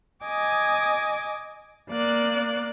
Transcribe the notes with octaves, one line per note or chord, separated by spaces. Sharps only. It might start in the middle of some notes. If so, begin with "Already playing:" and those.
D#5 G#5 D6 D#6
A#3 D5 F#6